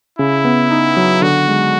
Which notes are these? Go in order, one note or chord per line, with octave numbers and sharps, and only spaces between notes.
C#3 E4
B3
D#4
F#3
D3 F#4
G#3